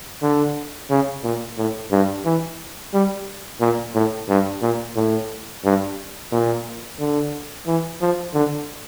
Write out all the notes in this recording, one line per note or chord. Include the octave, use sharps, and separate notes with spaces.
D3
C#3
A#2
A2
G2
E3
G3
A#2
A2
G2
A#2
A2
G2
A#2
D3
E3
F3
D3